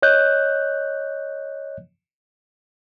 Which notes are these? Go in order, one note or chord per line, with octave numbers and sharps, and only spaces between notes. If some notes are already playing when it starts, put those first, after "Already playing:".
C#5 D#5 F#6 G6